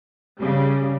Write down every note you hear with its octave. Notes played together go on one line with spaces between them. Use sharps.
C#3 G3